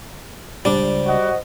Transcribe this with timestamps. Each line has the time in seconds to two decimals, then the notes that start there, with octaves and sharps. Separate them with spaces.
0.65 C#2 G3 D4 C5 D5
1.05 F#4 D#5 F#5